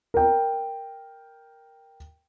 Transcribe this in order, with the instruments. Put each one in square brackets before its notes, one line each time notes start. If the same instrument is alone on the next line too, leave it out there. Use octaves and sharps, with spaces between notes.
[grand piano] A#4 G5